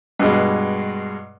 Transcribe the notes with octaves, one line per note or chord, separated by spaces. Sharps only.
G2 B2 G#3